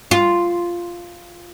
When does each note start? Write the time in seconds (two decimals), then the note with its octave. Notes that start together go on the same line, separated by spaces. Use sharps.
0.11 F4